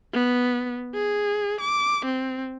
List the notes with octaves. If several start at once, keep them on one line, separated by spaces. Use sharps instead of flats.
B3
G#4
D6
C4